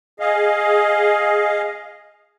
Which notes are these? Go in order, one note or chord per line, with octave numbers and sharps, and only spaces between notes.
G#4 D#5 F5